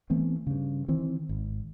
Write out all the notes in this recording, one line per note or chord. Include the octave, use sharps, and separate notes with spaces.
E3 A3 B3 C4
G2 C#3
D#3 E3 C4
G#1